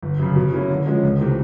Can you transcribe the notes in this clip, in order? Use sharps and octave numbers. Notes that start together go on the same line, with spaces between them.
G1
F#2 C#3
B2
F#3 A#3 C#4 E4
D3
F3 G#3 C#4
C#2
C3 E3 A3